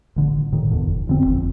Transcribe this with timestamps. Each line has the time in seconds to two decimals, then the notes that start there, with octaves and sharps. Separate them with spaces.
0.16 A1 D3
0.52 A2 D3 D#3
0.71 F#1 E2 D3
0.88 F1
1.07 E1 D3 C4
1.27 G1 F2